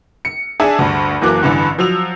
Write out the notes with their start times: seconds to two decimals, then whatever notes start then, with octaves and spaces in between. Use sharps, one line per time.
0.25 C#7
0.60 D4 G#4 E5 G#5 A5
0.79 D2 G2
1.21 F#1 E3 F#3 A#3 D6 F#6
1.43 A1 G2 D3 E3
1.78 F3 F#3 E6 F7